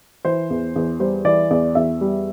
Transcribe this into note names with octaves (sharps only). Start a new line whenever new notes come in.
E3 C5
E2
E2
G3 C5
E3 D5
E2 D5
E2 E5
G3